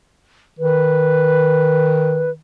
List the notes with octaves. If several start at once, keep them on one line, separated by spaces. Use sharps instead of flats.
D#3 B4